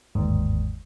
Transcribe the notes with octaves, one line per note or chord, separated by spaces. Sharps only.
G1 D#2 G#2